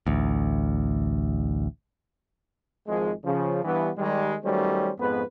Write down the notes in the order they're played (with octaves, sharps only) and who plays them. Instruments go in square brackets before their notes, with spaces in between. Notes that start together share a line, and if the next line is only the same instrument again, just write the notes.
[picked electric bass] A1 D2
[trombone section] G#1 G#2 F3 G#3
C#3 F3
G2 E3 B3
D#3 G3 G#3
D#3 F#3 G3 A3 C#4 C5
F2 G#2 B3 B4